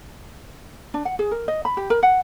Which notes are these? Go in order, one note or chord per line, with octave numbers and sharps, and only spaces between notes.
D4
F#5
G#4
A#4
D#5
B5
G4
A#4
F#5